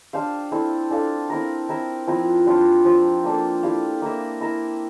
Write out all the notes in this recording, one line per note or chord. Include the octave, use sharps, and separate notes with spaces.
D4 G4 C5 F5
C4 E4 A4 D5
D4 A4 D5 F5
C4 E4 A#4
C4 E4 A#4 E5
F3 C4 E4 A#4
G3 D4 F4
F3 C4 G4 C5
A#3 D4 A4
E4 G4 D5 F5
A#3 E4 A#4 E5
E4 A#4 E5